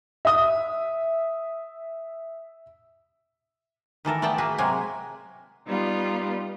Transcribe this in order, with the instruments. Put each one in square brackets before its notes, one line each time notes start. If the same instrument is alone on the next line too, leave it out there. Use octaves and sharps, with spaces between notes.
[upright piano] E5 D#6
[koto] D#3 E3 A4 A#4
A3 B3 D5 F#5 G5 A5
A#3 F#4 G#4 B4 G#5
C3 F#3 G#3 A#3 G#5 A#5
[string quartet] G3 B3 D#4 F4